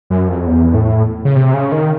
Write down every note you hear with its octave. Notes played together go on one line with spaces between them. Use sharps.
F#2
F2
E2
A2
C#3
C3
C#3
D#3